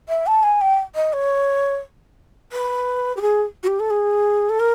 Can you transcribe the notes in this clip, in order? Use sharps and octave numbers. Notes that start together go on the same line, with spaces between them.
E5
A5
G#5
G5
D#5
C#5
B4
G4
G#4
F#4
G4
A4
G#4
A4
A#4